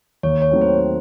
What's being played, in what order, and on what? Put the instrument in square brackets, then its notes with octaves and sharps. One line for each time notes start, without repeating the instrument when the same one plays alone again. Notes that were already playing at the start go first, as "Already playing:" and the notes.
[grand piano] D#2 [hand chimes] C#5
[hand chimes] C#5
[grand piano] D#3 F#3 A3 C4
[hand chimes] C5